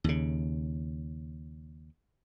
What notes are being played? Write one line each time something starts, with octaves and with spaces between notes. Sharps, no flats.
D#2 C#3